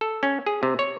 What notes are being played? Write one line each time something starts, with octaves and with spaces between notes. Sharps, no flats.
A4
C#4
G#4
C3
C#5